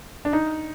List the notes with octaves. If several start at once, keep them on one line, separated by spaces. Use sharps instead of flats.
D4
D#4